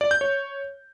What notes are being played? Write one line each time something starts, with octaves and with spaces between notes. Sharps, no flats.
D5
G6
C#5